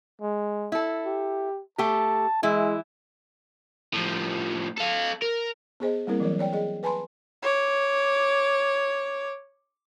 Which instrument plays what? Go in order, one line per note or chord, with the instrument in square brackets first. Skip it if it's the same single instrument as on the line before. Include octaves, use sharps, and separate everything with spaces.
[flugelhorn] G#3
[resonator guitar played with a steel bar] E4 A4
[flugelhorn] G4
[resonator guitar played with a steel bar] A3 G4 [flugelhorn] A5
[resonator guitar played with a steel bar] E3 E4 [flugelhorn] G#3
[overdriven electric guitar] A2 F3
A4 F5
A#4
[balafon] B3 G#4 C5 D#5
G3 A#3 C4 E4 A#4
E3 F#3 A#4 C#5
C#5 D5 G5
G#4 D#5
B4 G#5 A5 B5 C6
[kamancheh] C#5 D6